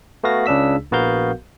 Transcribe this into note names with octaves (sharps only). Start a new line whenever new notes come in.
A3 B3 F#4 F5 A#6
C#2 C#3 D4 E6 B6
A#1 B3 F#4 A#4 F5 G6